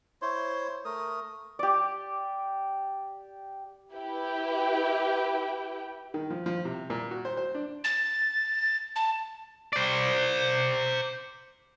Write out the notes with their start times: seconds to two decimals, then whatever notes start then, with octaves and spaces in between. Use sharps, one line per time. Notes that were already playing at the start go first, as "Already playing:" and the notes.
0.22 E4 C5 C#5 C6
0.85 A3 A#4 D#6
1.59 G4 D5
3.92 E4 G4 B4 G5
6.14 D#3
6.30 F3
6.46 F3
6.65 C3
6.90 A#2
7.11 F#4
7.25 C5
7.37 C5
7.55 D4
7.84 A6
8.96 A5
9.73 C5 D5